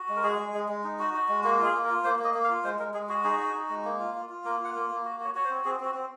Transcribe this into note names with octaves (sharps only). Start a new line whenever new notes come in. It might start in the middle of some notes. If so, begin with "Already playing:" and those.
Already playing: F#4
G#3
A#4
G#3 G#4
G#3
G#3
G#3
D#4
F#4
F#4
G#3
A#3 F#4
F4
G#4
A#3
A#4
F4
A#3 C5
A#3 D#5
A#3
F5
F4
G#3 C5
G#3 A#4
G#3 G#4
F#4 G#4
D#4 G#4
F#4
D#4
G#3
A#3
F4
F4
F4
A#3 A#4
F4
F#5
A#3
A#3
F#4
F#4 C#5
F#4 C#5
C5
C4
C4 G#4
C4 F#4
C4